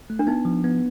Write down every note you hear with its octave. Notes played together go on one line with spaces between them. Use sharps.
A3
D4
B3 D#4
F3
B3